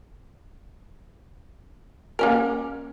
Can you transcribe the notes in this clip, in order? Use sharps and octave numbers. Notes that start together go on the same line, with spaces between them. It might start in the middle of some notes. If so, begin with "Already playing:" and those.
A#3 C#4 A#4